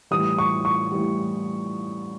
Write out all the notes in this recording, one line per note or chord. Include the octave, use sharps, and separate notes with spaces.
A2 E3 G3 D#6
C#6
C#6
A2 E3 G3